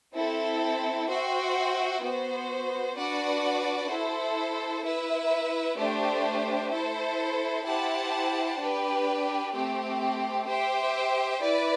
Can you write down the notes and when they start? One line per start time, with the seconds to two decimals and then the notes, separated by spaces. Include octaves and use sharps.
0.14 C4 E4 A4
1.08 F#4 C5 E5 G5
2.02 B3 F#4 C5
2.95 D4 F#4 B4 D5 F#5
3.90 E4 A4 C5
4.83 E4 B4 E5
5.77 A3 D4 G4 C5
6.71 E4 A4 C5
7.65 E4 G4 C5 F#5 A5
8.59 D4 G4 B4
9.52 A3 C4 G4
10.47 G4 C5 E5 G5
11.41 E4 B4 D5